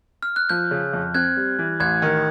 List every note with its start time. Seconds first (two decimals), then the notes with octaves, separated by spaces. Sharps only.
0.23 F6
0.36 F#6
0.49 F3 G6
0.71 C#3
0.93 F2
1.15 C4 F#6 G#6
1.36 G3
1.59 E3
1.80 A1 F#6 G#6
2.02 D#3